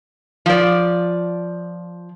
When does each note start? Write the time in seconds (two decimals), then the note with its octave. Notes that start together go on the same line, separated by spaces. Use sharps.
0.46 F3 D5